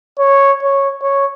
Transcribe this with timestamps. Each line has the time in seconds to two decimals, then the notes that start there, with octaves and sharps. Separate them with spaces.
0.19 C#5
0.62 C#5
1.02 C#5